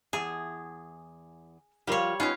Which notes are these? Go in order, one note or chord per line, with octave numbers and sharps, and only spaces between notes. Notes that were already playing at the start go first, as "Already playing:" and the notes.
E2 G#4 A5
F3 G3 F4 A#4 C#5
B3 C#4 D#4 F4 F5